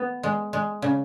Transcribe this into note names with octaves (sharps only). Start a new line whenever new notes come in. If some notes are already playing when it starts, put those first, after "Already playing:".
Already playing: B3
G#3
G#3
C#3